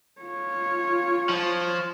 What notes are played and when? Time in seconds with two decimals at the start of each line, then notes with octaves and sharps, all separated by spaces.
0.21 F4 C#5
1.29 F3